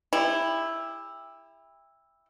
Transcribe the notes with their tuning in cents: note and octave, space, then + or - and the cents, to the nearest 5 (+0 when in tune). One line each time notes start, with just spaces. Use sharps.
E4 +0 G4 +40